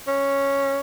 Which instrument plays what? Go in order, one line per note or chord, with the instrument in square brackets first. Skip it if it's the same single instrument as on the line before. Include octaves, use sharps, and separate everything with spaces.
[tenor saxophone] C#4